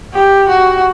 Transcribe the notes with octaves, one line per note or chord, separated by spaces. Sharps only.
G4
F#4